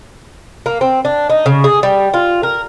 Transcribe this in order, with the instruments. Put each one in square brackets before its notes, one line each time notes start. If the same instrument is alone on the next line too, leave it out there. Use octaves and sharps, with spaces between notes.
[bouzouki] A#3
C4
D4
D#4
C#3
G#4
G3
F4
A#4